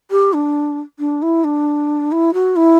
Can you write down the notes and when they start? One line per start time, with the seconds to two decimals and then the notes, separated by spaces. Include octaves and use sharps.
0.11 G4
0.33 D4
0.99 D4
1.22 E4
1.44 D4
2.12 E4
2.34 F#4
2.56 E4